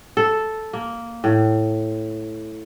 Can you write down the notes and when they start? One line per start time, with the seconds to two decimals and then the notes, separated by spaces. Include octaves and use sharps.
0.17 A4
0.73 A#3
1.24 A2